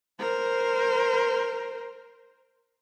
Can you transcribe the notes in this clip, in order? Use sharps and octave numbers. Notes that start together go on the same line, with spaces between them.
A#4 C5